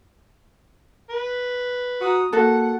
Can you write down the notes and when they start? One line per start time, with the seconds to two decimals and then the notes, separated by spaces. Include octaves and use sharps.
1.10 B4
2.01 F#4 A#5 D#6
2.33 A#3 F#4 A4 F#5